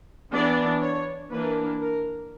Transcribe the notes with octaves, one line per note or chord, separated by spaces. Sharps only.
E3 B3 D4 D5
C#5
E3 A#3 D4 B4
A#4